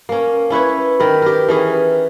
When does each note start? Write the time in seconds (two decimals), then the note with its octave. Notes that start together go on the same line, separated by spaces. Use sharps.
0.09 A#3 C#4
0.50 C#4 E4 B4 C#5
1.00 D#3 A#4 B4
1.22 G4 A#4
1.49 E3 C#4 G#4